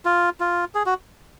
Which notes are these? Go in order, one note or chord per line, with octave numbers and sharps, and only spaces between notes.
F4
F4
G#4
F#4